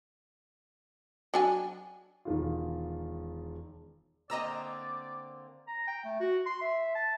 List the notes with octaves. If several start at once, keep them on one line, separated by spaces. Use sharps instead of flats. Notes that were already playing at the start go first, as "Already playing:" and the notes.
F#3 D4 G#5
E1 D#3 F4
D3 A#3 C4 D5 D#5 A#5 E6
A#5
G5
A3
F#4
C6
E5
A5